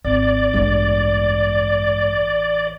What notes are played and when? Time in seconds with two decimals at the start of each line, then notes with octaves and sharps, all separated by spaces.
0.05 G#1 D5
0.54 A1 E2 G2 G#3